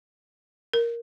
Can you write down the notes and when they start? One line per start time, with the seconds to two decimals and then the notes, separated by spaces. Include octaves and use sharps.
0.74 A#4